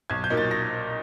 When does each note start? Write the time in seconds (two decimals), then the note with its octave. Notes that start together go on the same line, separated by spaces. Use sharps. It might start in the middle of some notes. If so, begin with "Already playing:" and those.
0.10 B1 G#6
0.24 G6
0.30 A#2 F#3 A#3 D#4
0.37 A6
0.51 A#6